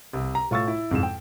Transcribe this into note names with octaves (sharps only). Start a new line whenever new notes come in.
C2
A#5
A2 F4 C#6 E6 A6
E4
F2 G#2 E7
G5